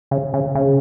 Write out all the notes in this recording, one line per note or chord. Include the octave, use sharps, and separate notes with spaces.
C#3
C#3
C#3